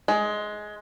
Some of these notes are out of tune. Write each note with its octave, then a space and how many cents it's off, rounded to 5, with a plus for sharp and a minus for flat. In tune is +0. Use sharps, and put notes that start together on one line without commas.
G#3 +15